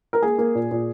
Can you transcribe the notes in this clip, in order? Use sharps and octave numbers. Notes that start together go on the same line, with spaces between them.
A#4
A#3 G#4
A#3
A#2
A#2